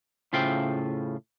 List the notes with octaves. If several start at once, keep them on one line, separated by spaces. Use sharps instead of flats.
A2 C#3 F4 C5 E5 G5